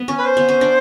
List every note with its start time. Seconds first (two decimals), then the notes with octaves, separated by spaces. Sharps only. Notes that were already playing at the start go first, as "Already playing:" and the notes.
Already playing: B3
0.08 C#4
0.17 B4
0.25 C5
0.37 B3
0.49 C#4
0.61 D4